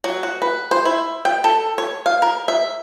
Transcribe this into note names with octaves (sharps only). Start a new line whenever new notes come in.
F#3
F#4
B4
C5
E4
G5
A4
C#5
F5
A#4
E5